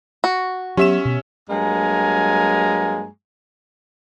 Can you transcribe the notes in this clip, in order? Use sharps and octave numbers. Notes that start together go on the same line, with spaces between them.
F#4
F#3 B3 C#4 G4 E5 E7
B2
G2 F#3 G#3 A#3 G#5 A#5